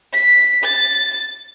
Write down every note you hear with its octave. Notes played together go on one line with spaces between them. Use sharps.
B6
A6